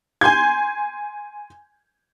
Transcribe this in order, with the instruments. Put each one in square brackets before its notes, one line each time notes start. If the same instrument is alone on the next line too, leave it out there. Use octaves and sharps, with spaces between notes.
[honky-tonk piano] G#5 C6 G6 G#6